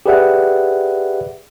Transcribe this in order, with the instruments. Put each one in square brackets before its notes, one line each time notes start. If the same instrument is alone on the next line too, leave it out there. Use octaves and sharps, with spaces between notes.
[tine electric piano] G4 G#4 B4 D5 E5 F#5